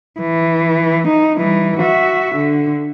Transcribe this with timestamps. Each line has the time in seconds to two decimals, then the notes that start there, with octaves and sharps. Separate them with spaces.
0.20 E3
1.08 D#4
1.38 E3 G3
1.80 F#4 E5
2.36 D3